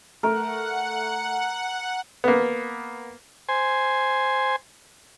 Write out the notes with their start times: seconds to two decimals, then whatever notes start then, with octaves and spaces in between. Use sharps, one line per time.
0.23 A3 A#4 F#5
2.24 A#3 B3
3.49 C5 G#5